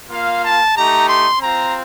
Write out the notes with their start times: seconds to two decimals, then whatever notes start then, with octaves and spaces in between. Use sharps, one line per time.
0.10 A#3 F4 F5
0.43 A5
0.76 A3 D#4 G4 A#5
1.08 C6
1.40 C4 F4 A#5